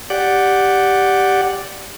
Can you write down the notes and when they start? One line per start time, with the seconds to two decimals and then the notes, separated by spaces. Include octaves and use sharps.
0.10 G4 D5 F#5